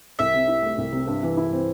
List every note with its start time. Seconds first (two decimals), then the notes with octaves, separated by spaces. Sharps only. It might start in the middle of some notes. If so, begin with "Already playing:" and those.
0.19 C2 E5
0.34 C3
0.48 E4
0.63 A3
0.78 C2
0.92 C3
1.07 G2
1.23 E3
1.37 E4
1.52 C4